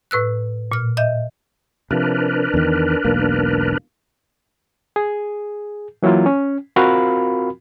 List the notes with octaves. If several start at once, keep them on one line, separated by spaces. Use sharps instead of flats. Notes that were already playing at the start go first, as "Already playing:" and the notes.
A2 B4 E6 F#6
A#2 F6
D#5 E5 G6
C3 F3 D4 A#4 B4
E2 D#3
E1 B1 A#3
G#4
E3 F#3 A#3 E4 F4
C#4
C4 F4 F#4 A#4 F5 B5